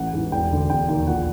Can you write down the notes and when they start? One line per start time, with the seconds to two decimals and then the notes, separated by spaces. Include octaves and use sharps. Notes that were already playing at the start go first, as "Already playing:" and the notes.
Already playing: A1 F#5
0.13 G#2 E3
0.32 E1 G5
0.51 D2 D3
0.70 E1 G5
0.88 D#2 D#3
1.07 A#1 F#5